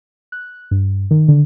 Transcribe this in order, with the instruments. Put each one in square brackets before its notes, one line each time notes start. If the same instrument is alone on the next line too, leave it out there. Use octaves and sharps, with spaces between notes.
[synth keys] F#6
G2
D#3
D3